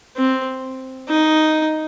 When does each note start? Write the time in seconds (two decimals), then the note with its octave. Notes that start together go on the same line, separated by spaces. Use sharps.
0.16 C4
1.09 D#4